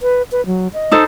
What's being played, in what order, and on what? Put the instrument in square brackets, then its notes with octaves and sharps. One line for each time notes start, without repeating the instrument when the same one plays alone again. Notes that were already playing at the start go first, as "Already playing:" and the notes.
[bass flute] B4
B4
F#3
D#5
[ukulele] D#4 A4 C5